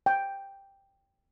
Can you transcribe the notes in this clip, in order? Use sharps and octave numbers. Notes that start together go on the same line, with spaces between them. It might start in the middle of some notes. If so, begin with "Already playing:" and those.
G5